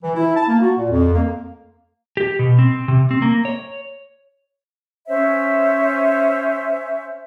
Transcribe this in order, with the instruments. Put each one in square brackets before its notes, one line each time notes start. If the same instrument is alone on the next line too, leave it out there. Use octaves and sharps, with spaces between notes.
[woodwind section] E3
E4
A5
A#3
F#4
A#2
F2
A#3
[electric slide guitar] G4
B2
C4
C3
C4
A#3
C#5
[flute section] C#4 C5 C#5 E5